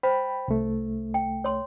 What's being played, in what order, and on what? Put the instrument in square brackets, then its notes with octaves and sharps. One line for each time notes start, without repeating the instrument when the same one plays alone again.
[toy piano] C5 [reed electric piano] G5 B5
[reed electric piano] C2 A3
[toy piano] G5
C#5 C6